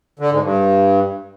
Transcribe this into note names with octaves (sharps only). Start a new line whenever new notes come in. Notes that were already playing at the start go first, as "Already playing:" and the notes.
D3
G#2
G2